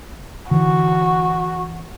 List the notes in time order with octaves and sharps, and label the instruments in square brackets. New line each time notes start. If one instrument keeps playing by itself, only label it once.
[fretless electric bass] D3 E3 [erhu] F#4